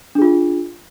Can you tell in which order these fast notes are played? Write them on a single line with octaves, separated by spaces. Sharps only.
D4 G#4 F4